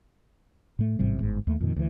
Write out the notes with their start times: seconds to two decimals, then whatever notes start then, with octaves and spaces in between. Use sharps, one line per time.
0.79 A2 A3
0.99 A1 G#2 C3 G3
1.20 G1 G#2
1.47 D#2 A3
1.60 F2 A#2 D#3
1.76 D2 E3